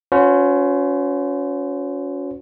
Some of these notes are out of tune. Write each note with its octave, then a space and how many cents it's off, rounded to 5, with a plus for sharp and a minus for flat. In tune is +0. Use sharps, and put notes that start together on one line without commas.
C#4 +20 F#4 -35 C5 -40